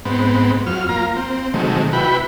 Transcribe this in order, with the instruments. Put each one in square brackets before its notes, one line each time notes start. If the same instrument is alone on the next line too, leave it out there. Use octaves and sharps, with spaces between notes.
[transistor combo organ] G#2 B3 C4
F2 F#3 F6
A#3 F4 A#5
C4
C3 D#3 F#3 G#3 A3
E4 F#4 B4 G5 B5